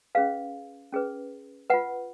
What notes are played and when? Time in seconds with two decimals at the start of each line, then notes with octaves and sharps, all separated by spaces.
0.15 C#4 G#4 B4 F5
0.92 C#4 G#4 B4
1.70 F4 B4 F#5